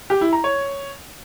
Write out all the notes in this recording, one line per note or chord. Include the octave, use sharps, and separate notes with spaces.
G4
E4
A#5
C#5